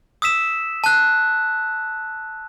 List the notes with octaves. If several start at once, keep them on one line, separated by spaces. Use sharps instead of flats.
D#6 E6 B6 E7
A5 F#6